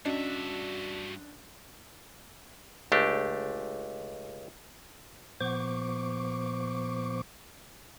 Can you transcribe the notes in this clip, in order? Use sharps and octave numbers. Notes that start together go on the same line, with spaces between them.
G2 C#4 D4 F#4 D#5 E5
C#2 A3 D4 G4
A#2 F3 B3 C5 C#6 D6